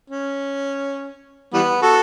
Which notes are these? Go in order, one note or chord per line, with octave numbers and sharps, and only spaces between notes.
C#4
E3 G3 B3
F#4 A4